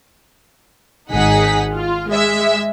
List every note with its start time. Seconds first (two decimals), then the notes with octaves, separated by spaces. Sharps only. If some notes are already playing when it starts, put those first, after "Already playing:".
1.10 G#1 D#4 G#4 F#5 B6
1.75 F4
2.11 G#3 E5